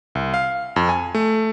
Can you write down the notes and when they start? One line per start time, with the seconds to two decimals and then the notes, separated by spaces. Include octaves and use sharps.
0.15 C2
0.34 F5
0.76 F2
0.89 G#5
1.15 A3